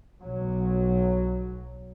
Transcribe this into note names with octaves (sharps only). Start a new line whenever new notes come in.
B1 F#3